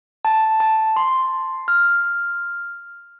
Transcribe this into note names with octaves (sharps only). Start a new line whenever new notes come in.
A5
A5
C6
F6